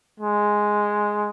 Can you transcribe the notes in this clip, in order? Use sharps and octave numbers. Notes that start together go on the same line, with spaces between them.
G#3